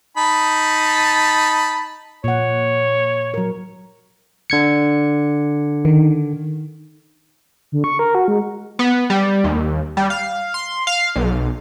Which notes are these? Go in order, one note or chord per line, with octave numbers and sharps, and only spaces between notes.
D#4 A5 B5
A#2 C#5 F#5
F#3 A#4
D3 G#6 C#7
D#3
D3
C#6
A#4
F#4
G#3
B3
G3
D#2
G3
F5
C6
F5
B1